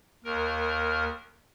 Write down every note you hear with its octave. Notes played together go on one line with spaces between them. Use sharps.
D#2 A#4